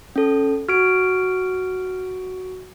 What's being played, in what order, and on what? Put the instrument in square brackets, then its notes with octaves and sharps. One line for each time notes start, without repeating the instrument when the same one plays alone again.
[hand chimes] C#4 A4
[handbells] F#4 D7 [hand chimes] F6